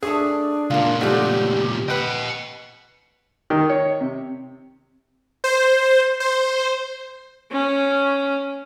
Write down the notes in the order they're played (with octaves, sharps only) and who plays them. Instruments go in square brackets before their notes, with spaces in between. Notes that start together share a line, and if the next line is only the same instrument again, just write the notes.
[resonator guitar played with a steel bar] A3 A4 [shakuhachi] D4 [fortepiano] G#4 D#6
[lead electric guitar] C#2 A#2 [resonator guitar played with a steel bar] F4 A#4
[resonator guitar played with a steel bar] F3 D#4 [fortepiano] A3 D4 F#4 [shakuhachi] G4
[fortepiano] B4 G5 [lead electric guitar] D#5 F#5
[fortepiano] D#3
C#5
C3
[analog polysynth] C5
C5
[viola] C#4